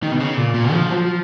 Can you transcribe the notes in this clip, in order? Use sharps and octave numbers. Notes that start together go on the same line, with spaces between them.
D#3
B2
C#3
A#2
A#2
F3
F#3
F3